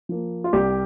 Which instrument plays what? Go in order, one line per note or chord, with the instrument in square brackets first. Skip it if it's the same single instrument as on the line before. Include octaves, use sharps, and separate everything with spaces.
[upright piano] F3 A#3
F4
C2 G4